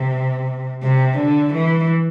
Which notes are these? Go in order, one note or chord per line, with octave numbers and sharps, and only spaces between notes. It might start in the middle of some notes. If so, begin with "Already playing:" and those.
Already playing: C3
C3
D3
E3